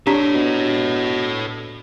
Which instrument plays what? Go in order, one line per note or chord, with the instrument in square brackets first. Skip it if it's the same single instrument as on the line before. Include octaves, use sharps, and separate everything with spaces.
[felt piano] D4 [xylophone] G4 A#5 B6 [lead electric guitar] A4 C#5
[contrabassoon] B2